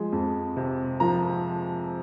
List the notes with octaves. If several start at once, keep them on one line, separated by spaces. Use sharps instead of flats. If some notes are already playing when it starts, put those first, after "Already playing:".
Already playing: F3 G#3
F2
C3
F3 A#5